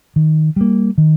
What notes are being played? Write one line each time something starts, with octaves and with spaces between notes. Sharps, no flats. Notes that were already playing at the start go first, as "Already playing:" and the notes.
D#3
G3 A#3
D#3